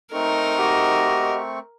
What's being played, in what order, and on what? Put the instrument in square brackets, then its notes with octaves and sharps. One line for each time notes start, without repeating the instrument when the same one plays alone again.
[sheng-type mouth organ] A3 C4 C#6 [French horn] D#4 [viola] A#4
[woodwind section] F#4 G4 D#5